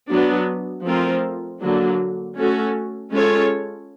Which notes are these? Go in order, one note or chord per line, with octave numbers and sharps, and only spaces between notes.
F#3 B3 D4
F3 A3 C4 F4 A#4
D3 F#3 A#3 D4
A3 C#4 F#4 A4
G#3 C#4 F4 A4 C#5